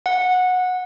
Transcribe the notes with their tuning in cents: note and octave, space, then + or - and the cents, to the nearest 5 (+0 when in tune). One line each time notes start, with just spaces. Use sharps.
F#5 -15